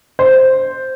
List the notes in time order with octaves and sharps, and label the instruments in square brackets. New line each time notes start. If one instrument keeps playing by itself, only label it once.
[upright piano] C5